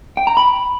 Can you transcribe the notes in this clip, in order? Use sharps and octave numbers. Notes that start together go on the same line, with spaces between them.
G5
A#5
B5